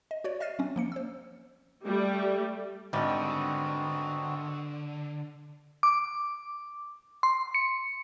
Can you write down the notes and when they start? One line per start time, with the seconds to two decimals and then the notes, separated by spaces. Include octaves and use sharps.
0.11 D#5
0.24 F#4 C#5 D5
0.40 D#5 E5 F6 A6 C7 D#7
0.59 F#3 C4 C#4
0.76 F3 A#3 C#7
0.92 C5 E6
1.83 G3 A3
2.93 G#1 D3 G3 B3 C4 F#4
5.83 D6
7.23 C6
7.54 C#7